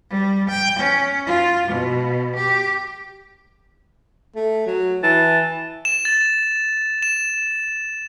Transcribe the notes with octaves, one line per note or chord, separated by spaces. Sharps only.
G3
G5
C#4
F4
B2
G4
A3
F#3
E3 A5
E7
A6
E7